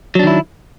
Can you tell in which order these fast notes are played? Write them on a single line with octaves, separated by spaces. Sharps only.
F#3 D4 D#3 E4